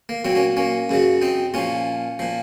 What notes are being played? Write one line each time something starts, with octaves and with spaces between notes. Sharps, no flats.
A#3
A#2 F#3 C4
A#3 C#4
A#3 C#4
F#2 C#3 F#3
C4 D#4
A#2 F3 C#4 F4
A#2 F3